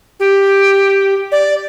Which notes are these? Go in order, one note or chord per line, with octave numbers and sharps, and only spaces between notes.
G4
D5